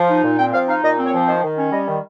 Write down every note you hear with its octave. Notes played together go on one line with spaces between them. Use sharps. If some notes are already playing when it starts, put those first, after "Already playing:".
Already playing: F3
D#4
A#2
C4 G5
F3 F5
D#4 F5
A#2 D#5
C4
C#5
F3
D#3 C5
D#3
C#4
G3 D#5
D#3